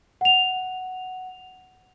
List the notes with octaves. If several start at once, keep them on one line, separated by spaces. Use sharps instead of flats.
F#5 F7